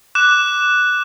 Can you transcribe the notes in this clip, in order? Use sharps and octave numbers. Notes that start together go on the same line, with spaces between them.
D6 F#6 E7